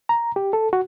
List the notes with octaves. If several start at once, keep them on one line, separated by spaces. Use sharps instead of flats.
A#5
G4
A4
F#4